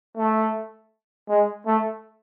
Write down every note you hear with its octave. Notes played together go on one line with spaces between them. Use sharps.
A3
G#3
A3